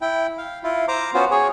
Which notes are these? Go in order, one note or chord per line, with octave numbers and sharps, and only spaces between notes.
E4 G5
F5
E4 F4
C5 A#5 D6
B3 C#4 F4 F#4 C5
G#4 C#5